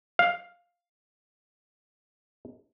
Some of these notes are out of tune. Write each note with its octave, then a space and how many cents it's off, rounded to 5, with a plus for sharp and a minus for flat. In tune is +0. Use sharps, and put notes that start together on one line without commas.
F5 +5